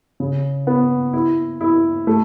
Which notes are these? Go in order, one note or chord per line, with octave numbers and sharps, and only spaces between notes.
C#3
B3
E4
E4
A3